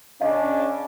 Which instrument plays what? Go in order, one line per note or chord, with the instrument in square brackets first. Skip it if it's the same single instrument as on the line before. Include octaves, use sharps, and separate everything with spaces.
[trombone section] C#3 C#4 D4 [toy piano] D#5 F5